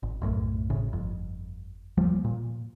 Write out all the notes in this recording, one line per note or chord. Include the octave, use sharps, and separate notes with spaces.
G#1
B1 F#2 A2
G#1 A2 C#3
G1 F2
E2 F3 G3 A#3
A#2